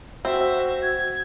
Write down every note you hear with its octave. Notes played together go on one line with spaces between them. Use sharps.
C4 F#4 E5
G#6